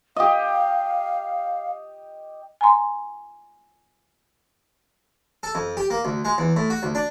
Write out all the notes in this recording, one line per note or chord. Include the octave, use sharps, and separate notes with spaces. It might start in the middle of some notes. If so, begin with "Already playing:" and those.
G4 D#5 F5
G#5 A#5 C6
A4
F2
G4
A#3
D2
G#3
E2
A2
F#4
D2
D4